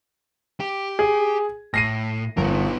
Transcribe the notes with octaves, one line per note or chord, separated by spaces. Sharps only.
G4
G#4
A2 A#6 C7 D#7
G1 B3 A#4
B3 D#4